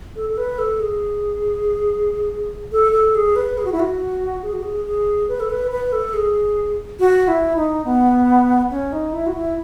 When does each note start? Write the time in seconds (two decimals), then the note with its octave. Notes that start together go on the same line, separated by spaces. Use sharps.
0.16 A4
0.30 A4
0.37 B4
0.58 A4
0.80 G#4
2.72 A4
2.93 A4
3.15 G#4
3.36 B4
3.58 G#4
3.65 F#4
3.72 E4
3.80 F#4
4.43 G#4
4.53 F#4
4.63 G#4
4.85 G#4
5.28 B4
5.40 A4
5.50 B4
5.71 B4
5.92 A4
6.14 G#4
6.99 F#4
7.28 E4
7.56 D#4
7.85 B3
8.70 C#4
8.93 D#4
9.13 E4
9.26 F#4
9.35 E4